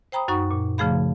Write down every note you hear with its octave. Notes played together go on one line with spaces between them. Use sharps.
C5 G5 A#5 B5 D#6
F#2 D#4 F#4 F#5 C#6
A#2
C#3 F3 A3 G#4 F5 B5